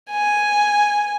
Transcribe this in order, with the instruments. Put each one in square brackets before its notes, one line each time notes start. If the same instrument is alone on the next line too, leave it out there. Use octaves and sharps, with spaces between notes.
[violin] G#5